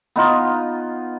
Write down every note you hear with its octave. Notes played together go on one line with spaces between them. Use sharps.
B3 D#4 F4